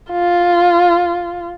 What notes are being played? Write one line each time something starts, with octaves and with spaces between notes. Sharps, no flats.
F4